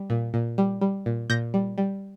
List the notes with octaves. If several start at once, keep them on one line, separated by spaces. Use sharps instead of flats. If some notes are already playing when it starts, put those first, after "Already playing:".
Already playing: G3
A#2
A#2
G3
G3
A#2
A#2 G6 A#6
G3
G3